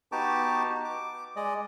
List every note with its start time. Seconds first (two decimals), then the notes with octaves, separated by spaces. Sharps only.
0.12 B3 D#4 F#4 G4 A5 D6
0.85 D6
1.36 G#3 D5 D#5